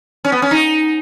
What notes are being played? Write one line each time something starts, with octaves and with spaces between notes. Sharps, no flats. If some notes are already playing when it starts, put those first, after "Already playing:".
C#4
B3
C#4
D#4